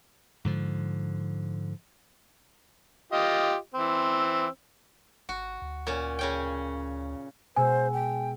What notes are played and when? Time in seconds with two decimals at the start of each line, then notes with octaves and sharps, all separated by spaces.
0.45 G#2 D3 F3
3.12 F4 G4 D#5
3.74 E3 C4
5.29 G#1 F#4
5.62 D2
5.87 A#2 C#4
6.19 C#3 C#4 G5
7.56 B2 G#3 C5 G#5 E6
7.93 G5